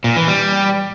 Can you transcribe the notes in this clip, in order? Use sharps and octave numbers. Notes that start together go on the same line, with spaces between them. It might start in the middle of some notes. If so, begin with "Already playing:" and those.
A#2
E3
G3